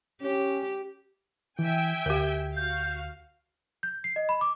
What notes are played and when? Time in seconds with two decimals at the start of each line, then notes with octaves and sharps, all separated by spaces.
0.22 C#4 G4
1.59 E3 E5 G5 G#5
2.06 D2 G4 A#4
2.57 F#4 F5 G6
3.83 G6
4.04 C7
4.16 D#5
4.29 B5
4.41 D6